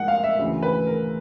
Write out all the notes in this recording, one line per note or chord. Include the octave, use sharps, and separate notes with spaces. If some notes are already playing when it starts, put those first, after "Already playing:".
Already playing: G#2 F3 F#5
F5
E5
D2 C#3 E3
B4
A#4